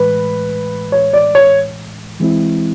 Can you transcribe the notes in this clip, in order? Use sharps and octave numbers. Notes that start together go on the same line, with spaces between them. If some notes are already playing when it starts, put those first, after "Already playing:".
Already playing: A2 E3 G#3 B4
C#5
D5
C#5
E3 G#3 C4 E4